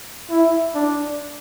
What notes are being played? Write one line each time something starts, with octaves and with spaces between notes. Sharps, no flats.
E4
D4